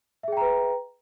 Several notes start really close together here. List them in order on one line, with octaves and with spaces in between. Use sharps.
E5 G#4 G5 A#5 B4